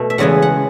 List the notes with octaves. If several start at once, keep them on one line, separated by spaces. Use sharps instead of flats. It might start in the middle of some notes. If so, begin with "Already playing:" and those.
Already playing: B2 A3
E5
E2 C#3 G#3 B3 F#5
F#5